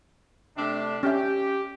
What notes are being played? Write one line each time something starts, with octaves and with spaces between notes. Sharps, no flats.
C3 A3 D4
C#4 G4 E5